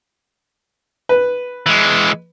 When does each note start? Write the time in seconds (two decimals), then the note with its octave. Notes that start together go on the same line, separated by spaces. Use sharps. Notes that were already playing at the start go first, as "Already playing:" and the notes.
1.09 B4
1.66 E3 G#3